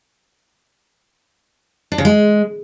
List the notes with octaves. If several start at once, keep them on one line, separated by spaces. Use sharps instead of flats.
D4
C#3
G#3